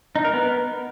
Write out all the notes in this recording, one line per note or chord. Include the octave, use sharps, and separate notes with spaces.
D#4
A#4
B3